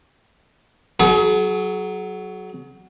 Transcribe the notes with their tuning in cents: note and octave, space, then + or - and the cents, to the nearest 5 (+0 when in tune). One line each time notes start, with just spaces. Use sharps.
F#3 +10 G#4 +40